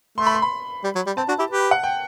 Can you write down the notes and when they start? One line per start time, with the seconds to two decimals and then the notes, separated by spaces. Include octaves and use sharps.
0.18 A3 C6
0.27 B5
0.34 C6
0.42 B5
0.84 G3
0.95 F#3
1.06 G3
1.17 C4 A5
1.28 D4 F#4
1.39 E4 G4
1.50 G4 B4
1.71 F#5
1.84 G5